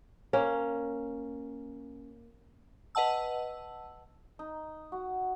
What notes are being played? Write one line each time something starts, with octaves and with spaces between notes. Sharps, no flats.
A#3 C#4
B4 D#5 F#5 A5 E6
D#4
F#4